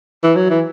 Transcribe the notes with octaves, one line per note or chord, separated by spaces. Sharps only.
E3
F#3
E3